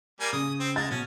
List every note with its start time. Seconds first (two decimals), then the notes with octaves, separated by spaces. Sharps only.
0.20 G3 A#3 G#5
0.33 C#3 D#6
0.60 C4
0.76 G#3 A6
0.91 B2 C#4